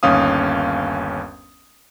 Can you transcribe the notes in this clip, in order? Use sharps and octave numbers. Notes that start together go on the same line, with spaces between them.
G1 D#2 C#4 F5 D#6